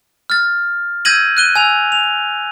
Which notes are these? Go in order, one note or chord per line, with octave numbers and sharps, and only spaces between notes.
F6 A6
E6 G6 G#6 A#6 D#7 F#7
F#6 D#7 G7
G#5 E6 F7
F7